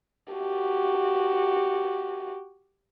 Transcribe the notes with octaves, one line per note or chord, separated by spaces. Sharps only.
F#4 G4